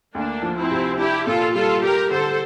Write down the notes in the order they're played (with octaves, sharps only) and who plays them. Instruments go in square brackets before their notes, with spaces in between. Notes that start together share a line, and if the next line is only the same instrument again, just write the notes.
[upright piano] D2 [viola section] A#3 D4
[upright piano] F3
[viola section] C4 E4
[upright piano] C3
[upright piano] D4 [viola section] E4 G4
[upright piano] A#2 [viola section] F4 A4
[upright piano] G3 [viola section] F4 A4
[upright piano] G3 [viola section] G4 A#4
[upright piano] D3 [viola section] A4 C5